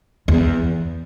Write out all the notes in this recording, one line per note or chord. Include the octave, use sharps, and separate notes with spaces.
E2